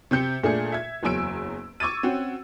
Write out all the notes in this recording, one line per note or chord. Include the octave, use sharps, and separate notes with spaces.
C3 C4 G6 C#7
A#2 A3 D4 G#4 C#7
E5 G#6
F#1 E2 F#3 G#5 E6 D7
C#6 D6 E6 G#6 A6 D#7
C4 C#4 F#4